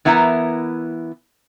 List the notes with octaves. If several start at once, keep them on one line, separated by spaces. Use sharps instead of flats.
E3 B3 E4 A#4 A#5